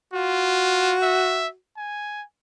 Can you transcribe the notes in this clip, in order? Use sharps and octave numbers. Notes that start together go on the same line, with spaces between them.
F4 F#4
E5
G#5